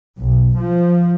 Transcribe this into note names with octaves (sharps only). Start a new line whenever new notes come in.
B1
F3